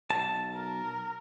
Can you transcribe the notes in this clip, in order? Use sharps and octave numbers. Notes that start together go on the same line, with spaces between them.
B1 A5
A#4